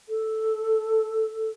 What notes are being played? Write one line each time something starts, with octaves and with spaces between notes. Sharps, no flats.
A4